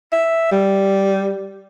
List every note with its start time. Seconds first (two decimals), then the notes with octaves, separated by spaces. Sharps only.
0.13 E5
0.52 G3